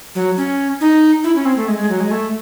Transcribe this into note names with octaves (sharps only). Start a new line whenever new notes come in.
F#3
C#4
D#4
E4
C#4
C4
A3
G#3
G#3
F#3
G#3
A3